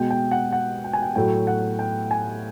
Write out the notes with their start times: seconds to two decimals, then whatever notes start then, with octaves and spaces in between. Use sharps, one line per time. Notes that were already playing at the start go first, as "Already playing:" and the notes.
Already playing: B2 G#3 G5
0.10 G5
0.31 F#5
0.53 F#5
0.84 G5
0.93 G#5
1.02 G5
1.16 A2 F#3 A3 G5
1.47 F#5
1.79 G5
2.11 G#5